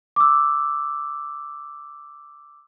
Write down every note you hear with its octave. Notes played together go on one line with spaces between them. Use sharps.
D6 E6